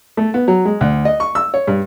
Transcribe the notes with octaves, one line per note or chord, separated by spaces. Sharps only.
A3
B3
F#3
G#3
D2
D#5
C#6
E6
C#5
G2